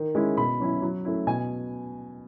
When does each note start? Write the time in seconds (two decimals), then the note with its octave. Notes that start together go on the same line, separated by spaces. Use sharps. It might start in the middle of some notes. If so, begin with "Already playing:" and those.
Already playing: D#3
0.15 G#3 C#4 E4
0.37 B2 B5
0.60 F#3 C#4 E4
0.82 F#3
1.05 A3 C#4 E4
1.27 B2 G#5